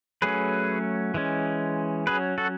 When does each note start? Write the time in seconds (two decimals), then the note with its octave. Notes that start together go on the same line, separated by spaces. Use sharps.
0.22 F#3 A3 C#4 G#4 B4
1.14 E3 G#3 C#4
2.07 F#3 C#4 G#4 B4
2.38 F#4 A4